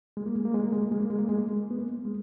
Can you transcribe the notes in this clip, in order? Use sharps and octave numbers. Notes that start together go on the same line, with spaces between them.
G#3
A#3
G#3
A#3
G#3
A#3
G#3
A#3
G#3
A#3
G#3
A#3
G#3
A#3
G#3
B3
A#3
G#3